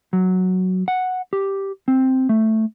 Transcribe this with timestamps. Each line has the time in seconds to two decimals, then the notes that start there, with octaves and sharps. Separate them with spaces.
0.13 F#3
0.88 F#5
1.33 G4
1.88 C4
2.29 A3